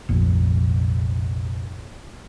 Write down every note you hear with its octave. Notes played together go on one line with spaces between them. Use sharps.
F1 A#1